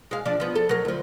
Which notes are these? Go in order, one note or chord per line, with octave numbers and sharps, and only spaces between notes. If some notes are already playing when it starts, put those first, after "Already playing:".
G#3 F5
F3 D4
F3 B3
A4
F#3 A#4
D2 F3